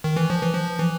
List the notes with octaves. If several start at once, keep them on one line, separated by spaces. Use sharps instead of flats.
D#3
E3
F3
E3
F3
E3